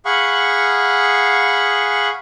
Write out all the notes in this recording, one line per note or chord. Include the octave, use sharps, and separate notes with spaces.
G#4 F5 F#5 B5 C#6